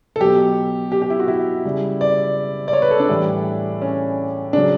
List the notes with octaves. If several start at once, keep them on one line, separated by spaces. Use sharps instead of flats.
A4
B2 F#3 G4
G4
G4
E4
F#4
E4
C#3 G3
D5
D5
C#5
B4
A4
D4
A2 E3 G3
C#4
C#3 F#3 D4